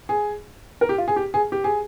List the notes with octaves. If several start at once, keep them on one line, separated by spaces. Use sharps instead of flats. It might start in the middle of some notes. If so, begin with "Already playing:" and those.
G#4
A#4
G4
F4
G#4
G4
G#4
G4
G#4